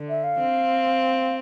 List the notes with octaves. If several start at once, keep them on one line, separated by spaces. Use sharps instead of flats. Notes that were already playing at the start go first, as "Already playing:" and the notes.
Already playing: D3
E5
F5
C4